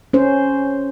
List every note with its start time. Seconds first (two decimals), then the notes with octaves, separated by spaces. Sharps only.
0.13 C#4 C5